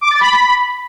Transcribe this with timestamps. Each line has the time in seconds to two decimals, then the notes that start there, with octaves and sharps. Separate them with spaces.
0.01 D6
0.11 A6
0.21 B5